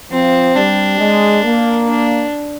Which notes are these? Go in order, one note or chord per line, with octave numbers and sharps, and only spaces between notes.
F3 C4
G3 D4
G#3
A#3
D4